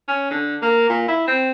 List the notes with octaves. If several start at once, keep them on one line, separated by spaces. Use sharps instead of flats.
C#4
D3
A#3
A#2
E4
C4